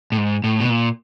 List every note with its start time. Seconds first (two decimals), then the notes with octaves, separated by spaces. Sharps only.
0.12 A2
0.17 G#2
0.44 A2
0.60 B2
0.70 A#2